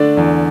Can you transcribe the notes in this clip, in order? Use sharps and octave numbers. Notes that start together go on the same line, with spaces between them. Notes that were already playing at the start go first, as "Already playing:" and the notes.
Already playing: D3 A3 D4 D5
E2